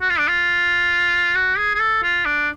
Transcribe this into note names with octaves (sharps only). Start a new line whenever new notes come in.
F#4
F4
D4
F4
F#4
G#4
G#4
A4
F4
D4